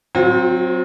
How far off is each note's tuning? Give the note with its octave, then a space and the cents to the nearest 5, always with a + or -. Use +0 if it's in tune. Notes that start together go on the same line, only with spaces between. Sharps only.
F#3 +0 C4 +0 F4 +45